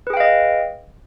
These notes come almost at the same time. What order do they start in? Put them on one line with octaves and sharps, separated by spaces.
B4 G#4 G5 F5 D#5